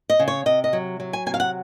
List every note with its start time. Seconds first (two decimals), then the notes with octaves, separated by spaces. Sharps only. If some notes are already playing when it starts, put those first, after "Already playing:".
0.10 D#5
0.19 C#3
0.28 C#5
0.46 C3 D#5
0.64 D#5
0.73 F#3
1.00 F#3
1.13 G#5
1.26 C3 G#5
1.34 F5
1.40 F#5